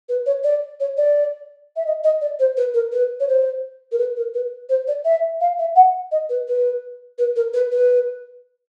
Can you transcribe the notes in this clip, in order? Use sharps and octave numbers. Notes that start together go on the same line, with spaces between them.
B4
C#5
D5
C#5
D5
E5
D#5
D#5
D5
C5
B4
A#4
B4
C#5
C5
A#4
B4
A#4
B4
C5
D5
E5
F5
E5
F#5
D#5
B4
B4
B4
A#4
B4
B4